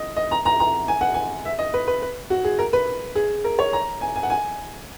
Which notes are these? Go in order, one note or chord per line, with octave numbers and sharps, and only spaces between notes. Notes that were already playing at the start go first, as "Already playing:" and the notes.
Already playing: D#5
D#5
A#5
A#5
A#5
G#5
F#5
G#5
E5
D#5
B4
B4
B4
F#4
G#4
A#4
B4
G#4
A#4
C#5
A#5
G#5
G#5
F#5
G#5